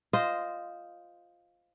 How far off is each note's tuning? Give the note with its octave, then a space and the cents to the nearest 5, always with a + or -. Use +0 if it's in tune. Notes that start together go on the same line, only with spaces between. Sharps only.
F4 +0 C5 -10 D#5 +0